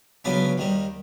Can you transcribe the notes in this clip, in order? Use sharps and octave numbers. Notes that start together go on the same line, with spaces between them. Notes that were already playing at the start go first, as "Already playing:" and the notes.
C#2 C#3 F#3 B3 D4
D#2 D#3 G3